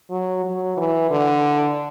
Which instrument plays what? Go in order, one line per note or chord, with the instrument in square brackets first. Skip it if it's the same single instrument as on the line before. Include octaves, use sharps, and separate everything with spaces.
[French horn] F#3
F#3
E3
D3